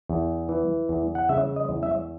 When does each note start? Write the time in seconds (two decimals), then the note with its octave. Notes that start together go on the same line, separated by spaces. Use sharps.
0.09 E2
0.49 E3
0.89 E2
1.15 F#5
1.29 C#3 E5
1.56 D#5
1.69 E2
1.83 E5